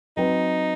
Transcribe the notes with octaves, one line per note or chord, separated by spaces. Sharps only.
F#3 C4 D#4 F#4 B4